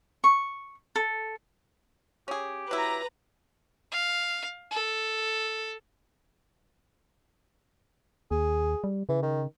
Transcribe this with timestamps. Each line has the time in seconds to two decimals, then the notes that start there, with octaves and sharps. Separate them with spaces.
0.24 C#6
0.96 A4
2.28 C#4 G4 G#4
2.71 F#3 E4 B4 A#5
3.92 F5
4.71 A4
8.31 D#2 G#4
8.84 G3
9.09 C#3 E3
9.22 D#3